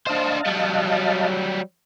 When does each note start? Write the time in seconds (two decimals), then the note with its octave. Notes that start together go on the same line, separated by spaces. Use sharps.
0.07 D4 C5 D#5 F5 A5
0.46 F#3 G3